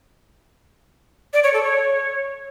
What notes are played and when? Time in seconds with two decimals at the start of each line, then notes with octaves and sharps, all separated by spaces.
1.34 D5
1.44 C#5
1.53 A4
1.63 C#5